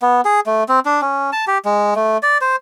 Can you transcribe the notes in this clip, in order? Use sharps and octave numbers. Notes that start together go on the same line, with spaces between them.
B3
G#4
A3
C4
D4
C#4
A5
G4
G#3
A3
D5
C5